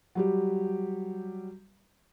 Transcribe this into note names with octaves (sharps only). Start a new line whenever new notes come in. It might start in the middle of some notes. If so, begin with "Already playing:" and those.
F#3 G3 G4